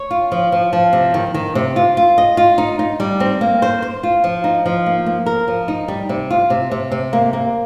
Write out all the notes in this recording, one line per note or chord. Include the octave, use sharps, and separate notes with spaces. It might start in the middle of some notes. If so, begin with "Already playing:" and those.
Already playing: C#5
F4
F3
F3
F3
C3
D#3
D#3
C3
F4
F4
D#5
F4
D#4
D#4
G3
C4
A#3
C5
C5
F4
F3
D#4
F3
A#3
A#3
A#4
F3
D#4
G3
C3
F4
C3
C3
C3
A#3
A#3